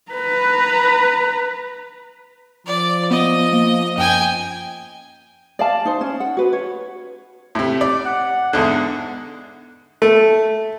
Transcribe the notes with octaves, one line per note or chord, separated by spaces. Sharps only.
B4 A#5
F3 D5
B3 D#5
A#3
F#2 G5 G#5
D5 F5 A5
D#4 C5
C#4
F#5
F#4 B4
C#5
A2 C3
D5
F#5
E2 G#2 D3 D4
A3